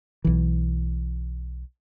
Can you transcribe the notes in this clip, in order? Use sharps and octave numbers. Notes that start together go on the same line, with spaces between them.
B1 E3